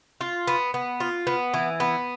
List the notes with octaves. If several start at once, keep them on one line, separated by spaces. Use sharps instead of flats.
F4
B3
B3
F4
B3
E3
B3